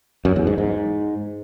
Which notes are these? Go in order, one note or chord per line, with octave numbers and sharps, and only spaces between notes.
F#2
E2
G#2
G#2